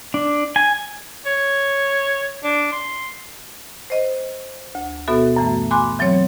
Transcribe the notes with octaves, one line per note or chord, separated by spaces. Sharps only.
D4
G#5
C#5
D4
C6
C5 D#5
D2
B2 B3 F#4 A4 E5
F#2 E3 A3
G#5 B5 C6 D6 F#6
E3 F#3 C4 C#5